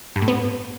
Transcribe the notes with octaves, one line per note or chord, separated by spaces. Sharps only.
G2
A2
B3